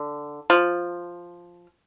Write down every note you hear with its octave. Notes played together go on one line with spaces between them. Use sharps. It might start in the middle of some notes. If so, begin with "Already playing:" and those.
Already playing: D3
F3